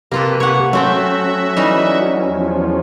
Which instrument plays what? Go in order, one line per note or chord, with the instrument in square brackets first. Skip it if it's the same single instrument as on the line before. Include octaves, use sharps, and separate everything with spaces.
[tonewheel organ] C3 G4 B4 [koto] A#3 F4 A4
[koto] C#5 F#5
[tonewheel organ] F#3 C#4 [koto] A3 C4 G5 [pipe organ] F#4 E5
[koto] E3 G3 D#4
[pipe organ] E2 F3